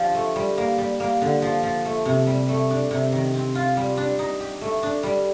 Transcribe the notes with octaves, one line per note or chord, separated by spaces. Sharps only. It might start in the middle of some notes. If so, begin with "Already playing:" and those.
Already playing: F3 D4 G4
A3
G3
A#3
G3
A#3
D3
F3
F3
A3
C3
G3
A3
D4
C3
D#3
C4
F4
G3
D4
D#4
G4
A3
D4
G3